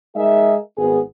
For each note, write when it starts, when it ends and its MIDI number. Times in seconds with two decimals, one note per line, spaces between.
0.16 0.56 56
0.16 0.56 63
0.16 0.56 68
0.16 0.56 70
0.16 0.56 75
0.16 0.56 76
0.77 0.99 32
0.77 0.99 59
0.77 0.99 68